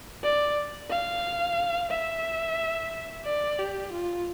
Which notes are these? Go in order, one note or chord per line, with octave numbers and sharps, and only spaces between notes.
D5
F5
E5
D5
G4
F4